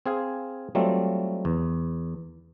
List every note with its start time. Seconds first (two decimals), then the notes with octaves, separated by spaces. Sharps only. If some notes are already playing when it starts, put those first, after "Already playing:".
0.06 C4 G#4 F5 G#5
0.75 F#3 G3 A3 C4 F4
1.45 E2